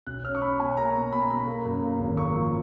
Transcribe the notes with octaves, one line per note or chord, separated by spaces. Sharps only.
B1 F#6
C#4 F6
C#6
C#4 B5
B2 G#5
A#3 A#5
B2
B2 B5
A#5
B2 B5
A#3
F#2
A#3
G#1
A#3 C#6
F3